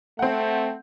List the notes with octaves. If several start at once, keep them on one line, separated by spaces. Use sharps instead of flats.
A3 C4 F#5